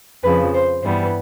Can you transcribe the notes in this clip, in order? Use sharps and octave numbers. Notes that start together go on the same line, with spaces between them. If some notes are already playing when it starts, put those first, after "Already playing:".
F2 C#3 F3 B4
C5
G2 E3 G3 B3 C5